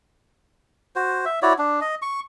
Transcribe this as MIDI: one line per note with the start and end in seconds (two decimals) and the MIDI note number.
0.96 1.25 66
0.96 1.25 72
1.25 1.40 76
1.42 1.53 64
1.42 1.53 66
1.42 1.53 73
1.42 1.53 74
1.58 1.80 62
1.81 1.95 75
2.02 2.20 85